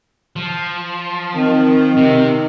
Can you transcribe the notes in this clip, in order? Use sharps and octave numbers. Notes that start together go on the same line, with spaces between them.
F3
D#3 C4
C3